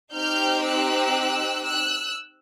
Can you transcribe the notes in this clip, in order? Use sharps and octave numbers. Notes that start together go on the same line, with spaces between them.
C4 D#4 G4 F6 G6
E6 F#6
E6 F#6